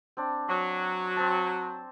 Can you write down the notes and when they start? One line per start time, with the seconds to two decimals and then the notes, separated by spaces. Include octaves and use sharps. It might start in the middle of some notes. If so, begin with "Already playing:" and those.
0.17 C4 D4
0.49 F#3
1.16 C4 A5